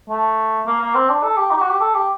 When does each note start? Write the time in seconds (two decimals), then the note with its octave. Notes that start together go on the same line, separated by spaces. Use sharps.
0.09 A3
0.66 A#3
0.80 A#3
0.95 C4
1.09 D4
1.23 A4
1.37 G4
1.51 D#4
1.57 G4
1.61 F#4
1.70 G4
1.80 A4
1.94 G4